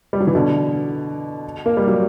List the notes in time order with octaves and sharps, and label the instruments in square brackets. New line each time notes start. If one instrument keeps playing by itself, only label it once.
[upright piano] G3
F#3
E3
B2 D3
A#3
G3
F#3